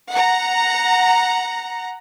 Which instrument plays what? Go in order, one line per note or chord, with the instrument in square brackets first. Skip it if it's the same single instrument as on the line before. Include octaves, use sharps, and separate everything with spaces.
[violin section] F#5 A#5